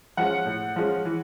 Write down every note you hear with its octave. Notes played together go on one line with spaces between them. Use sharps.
F3 G#3 C#4 F#5
A2
F3 G#3 C#4
E3